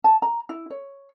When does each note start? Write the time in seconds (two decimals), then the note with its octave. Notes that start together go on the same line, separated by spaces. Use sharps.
0.04 A5
0.22 A#5
0.49 E4
0.70 C#5